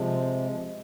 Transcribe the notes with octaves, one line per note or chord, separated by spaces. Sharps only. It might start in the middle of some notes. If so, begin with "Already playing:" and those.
Already playing: C3 F3 G#3